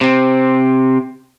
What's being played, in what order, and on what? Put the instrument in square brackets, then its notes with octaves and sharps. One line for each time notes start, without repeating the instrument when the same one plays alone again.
[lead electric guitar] C3 C4